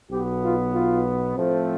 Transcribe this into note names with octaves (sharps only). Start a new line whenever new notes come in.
B1 B2 B3 G4
F4
F4
A2 F3 A3 C4